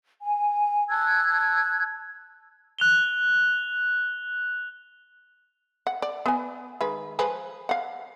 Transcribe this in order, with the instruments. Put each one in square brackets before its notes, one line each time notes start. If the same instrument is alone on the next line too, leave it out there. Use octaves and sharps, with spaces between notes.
[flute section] G#5
A5 E6 F#6 G#6
[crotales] F#6 F7 G7
[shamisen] F#5
D5
B3 G#5
D#3 G#3 B4
F3 G#4 B4
F5 F#5